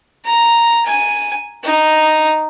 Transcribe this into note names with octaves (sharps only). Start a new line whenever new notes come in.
A#5
G#5
D#4